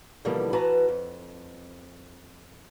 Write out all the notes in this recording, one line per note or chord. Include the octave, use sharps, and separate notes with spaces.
B2 D3 E3 F3 G3 A#3
E3 F#4 B4 A5 A#5
F2